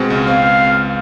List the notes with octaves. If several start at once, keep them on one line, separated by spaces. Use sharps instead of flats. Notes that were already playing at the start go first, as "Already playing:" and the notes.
Already playing: B2 G#3 C4
C#2
C4 F5